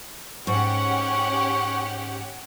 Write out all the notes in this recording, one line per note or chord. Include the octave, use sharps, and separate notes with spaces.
G#2 C#4 G4 F#5 C#6